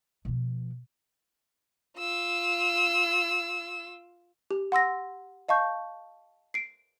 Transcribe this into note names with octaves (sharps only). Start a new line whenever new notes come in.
B2 F3
F4 E6
G4
F#5 C6 E6 A#6
D#5 F5 A5 C#6 G6
C7 D7